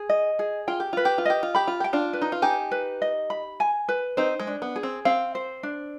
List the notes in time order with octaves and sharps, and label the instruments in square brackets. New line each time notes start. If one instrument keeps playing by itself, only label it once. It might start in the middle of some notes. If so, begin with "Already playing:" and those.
Already playing: [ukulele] G#4
D#5
G#4
[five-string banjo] F4 [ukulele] G5
[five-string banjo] G4
[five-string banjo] F4 [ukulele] B4
[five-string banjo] G4
F4
[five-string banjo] G4 [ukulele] D#5
[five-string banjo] F4
[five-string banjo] G4 [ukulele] B5
[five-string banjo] F4
[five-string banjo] G4 [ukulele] G5
[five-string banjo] D4 F4
[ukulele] B4
[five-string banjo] D#4
F4
[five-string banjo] D#4 G4 [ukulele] G#5
[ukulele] B4
D#5
B5
G#5
B4
[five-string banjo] C4 D#4 [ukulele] C5
[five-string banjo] G#3
[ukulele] D4
[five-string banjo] B3
[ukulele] G#4
[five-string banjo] C4
[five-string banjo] C4 [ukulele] F5
[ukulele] C5
D4